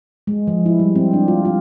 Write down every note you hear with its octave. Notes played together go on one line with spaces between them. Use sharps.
G#3
F3
E4
G3
C4
D4
F4
F4